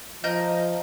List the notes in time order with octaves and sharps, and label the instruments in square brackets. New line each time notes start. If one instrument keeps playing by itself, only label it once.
[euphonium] F3 [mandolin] A#4 D#5 G6